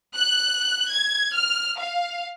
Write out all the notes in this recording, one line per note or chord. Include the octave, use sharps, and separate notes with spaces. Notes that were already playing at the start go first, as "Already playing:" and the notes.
F#6
G#6
F6
F5